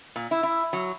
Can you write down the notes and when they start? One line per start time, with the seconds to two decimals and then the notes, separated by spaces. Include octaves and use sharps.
0.16 A#2
0.31 E4
0.43 E4
0.73 F#3